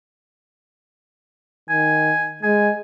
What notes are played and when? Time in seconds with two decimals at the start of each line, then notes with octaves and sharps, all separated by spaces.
1.69 D#3 G#5
2.43 G#3 G#5